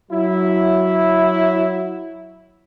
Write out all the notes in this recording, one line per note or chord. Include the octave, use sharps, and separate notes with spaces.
F#3 E4